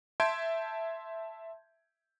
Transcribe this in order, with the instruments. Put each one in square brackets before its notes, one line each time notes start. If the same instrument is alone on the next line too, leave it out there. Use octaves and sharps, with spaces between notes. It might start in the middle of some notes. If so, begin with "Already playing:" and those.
[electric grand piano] E5 A5 C6 G6 G#6 D7